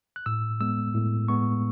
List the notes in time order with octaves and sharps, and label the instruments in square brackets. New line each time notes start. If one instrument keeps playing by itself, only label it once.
[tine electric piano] F#6
A2 E6
G#3 B3 E6
A2
G#3 B3 C#6